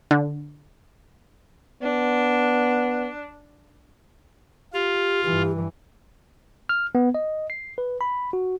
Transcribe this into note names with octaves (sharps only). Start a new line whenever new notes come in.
D3
B3 D4
F4 G4
G2 E3 G4
F6
B3
D#5
C7
B4
B5
F#4